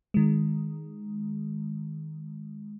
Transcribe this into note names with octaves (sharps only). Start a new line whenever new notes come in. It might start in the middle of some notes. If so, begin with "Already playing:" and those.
D#3 G#3